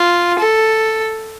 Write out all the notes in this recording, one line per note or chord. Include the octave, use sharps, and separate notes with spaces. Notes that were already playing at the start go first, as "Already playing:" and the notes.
Already playing: F4
A4